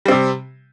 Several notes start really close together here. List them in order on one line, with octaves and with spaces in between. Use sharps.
G3 C4 C3